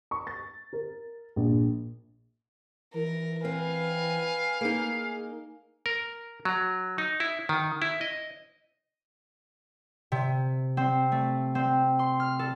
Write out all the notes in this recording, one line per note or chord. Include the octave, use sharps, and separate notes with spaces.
C#6
A6
A#4
A#1
E3 A#4
C4 B4 F5 G#5
A#3 D#4 G#4
A#4
F#3
D#4
E4
D#3
E4
D#5
C3
C4
A3
C4
C6
F6
A4